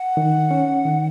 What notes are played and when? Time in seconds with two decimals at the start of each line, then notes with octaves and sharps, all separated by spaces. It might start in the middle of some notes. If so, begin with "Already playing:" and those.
Already playing: F#5
0.17 D#3
0.51 C#4
0.85 D#3